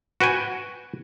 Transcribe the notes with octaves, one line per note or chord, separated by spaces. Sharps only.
F#4 B4 G5 G#5